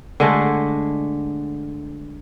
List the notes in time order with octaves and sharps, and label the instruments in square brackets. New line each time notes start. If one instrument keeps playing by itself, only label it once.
[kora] D3 G#3 A3